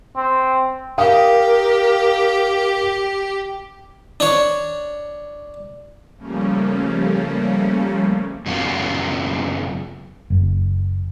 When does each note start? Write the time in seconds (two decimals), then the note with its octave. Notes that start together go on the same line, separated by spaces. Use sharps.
0.16 C4
0.98 G4 A#4 F5 G5 D#6
4.20 D4 C#5
6.18 C#3 F3 G3 A3 A#3 C#4
8.46 F#2 C#3 B3 F4
10.30 F#1